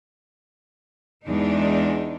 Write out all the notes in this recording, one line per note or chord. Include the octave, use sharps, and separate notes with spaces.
E2 G#3 D4 D#4